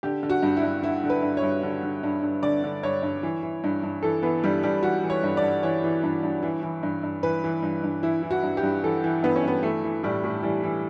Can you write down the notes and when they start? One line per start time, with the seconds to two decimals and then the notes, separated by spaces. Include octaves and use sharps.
0.03 D3 G4
0.23 D3
0.30 F#4
0.42 G2
0.57 E4
0.63 G2
0.83 D3 E4
1.04 D3
1.10 B4
1.23 G2
1.37 C#5
1.43 G2
1.63 D3
1.83 D3
2.03 G2
2.23 G2
2.43 D3 D5
2.64 D3
2.83 G2 C#5
3.03 G2
3.23 E3
3.43 E3
3.64 G2
3.83 G2
4.03 E3 A4
4.23 E3 B3
4.44 G2 G3
4.63 G2 G3
4.83 E3 F#4
5.04 E3
5.10 C#5
5.23 G2
5.37 D5
5.43 G2
5.63 E3 C#5
5.84 E3
6.03 G2
6.23 G2
6.43 E3
6.63 E3
6.83 G2
7.03 G2
7.23 E3 B4
7.44 E3
7.63 G2
7.83 G2
8.03 E3 E4
8.23 E3
8.31 F#4
8.43 G2
8.57 G4
8.63 G2
8.84 E3 A4
9.04 E3
9.23 G2 B3
9.36 C#4
9.43 G2 B3
9.63 E3 A3
9.84 E3
10.03 A2 G3
10.24 A2
10.43 E3 G3
10.64 E3